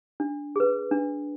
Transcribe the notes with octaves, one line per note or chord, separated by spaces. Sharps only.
D4
G#4 B4
D4